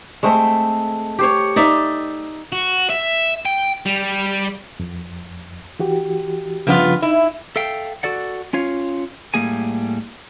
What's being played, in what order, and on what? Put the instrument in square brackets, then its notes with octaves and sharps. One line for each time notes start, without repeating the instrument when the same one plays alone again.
[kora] G#3 A3 C4
G4 C5 C#5
D#4 D5 E5
[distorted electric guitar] F#4
E5
G5
G3
[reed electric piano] F2
E3 F#4 G4
[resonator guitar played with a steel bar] G2 B3 F4 [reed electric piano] C#3 F3
[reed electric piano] D#4 [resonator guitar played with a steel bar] E4
[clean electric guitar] A4 E5 F5 G5
F#4 A4 D5 F#5
C#4 F4 C#5 F5
A2 G3 A#3 G#4 G#5